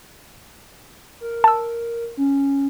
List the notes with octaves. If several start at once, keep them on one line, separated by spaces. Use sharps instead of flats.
A#4
A5 E6
C#4